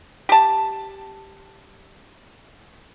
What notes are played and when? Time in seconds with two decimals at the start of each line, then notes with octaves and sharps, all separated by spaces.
0.29 G4 A5